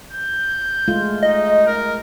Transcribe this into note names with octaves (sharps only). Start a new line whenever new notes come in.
G6
G#3 A3 F4
D#4 D#5
A#4